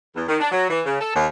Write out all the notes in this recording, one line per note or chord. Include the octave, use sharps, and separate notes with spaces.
E2
D#3
D4
F#3
E3
C#3
A4
D#2